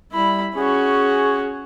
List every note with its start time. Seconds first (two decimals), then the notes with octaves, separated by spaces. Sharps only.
0.12 G3 E4 B5
0.55 C#4 F#4 G#4